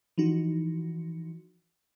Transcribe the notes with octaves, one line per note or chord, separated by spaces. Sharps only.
E3 F3 D#4 F#4